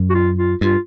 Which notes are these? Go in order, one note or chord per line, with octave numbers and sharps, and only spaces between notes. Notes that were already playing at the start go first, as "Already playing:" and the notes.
Already playing: F#2
F#4
F4
F4
G2 F4